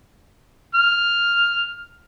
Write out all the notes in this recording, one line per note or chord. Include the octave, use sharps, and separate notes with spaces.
F6